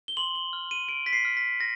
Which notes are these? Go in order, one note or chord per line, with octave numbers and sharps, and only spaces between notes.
G7
C6 F#7
G7
F6
D#7
C6 D7
B6
C7
F6
B6
A#6